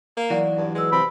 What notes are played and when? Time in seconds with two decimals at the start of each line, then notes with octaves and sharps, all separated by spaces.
0.17 A#3
0.30 E3 F#3 F#4 D5
0.57 G2
0.75 G#3 B4 E6
0.92 C3 B5